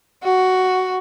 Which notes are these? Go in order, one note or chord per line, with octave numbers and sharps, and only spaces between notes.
F#4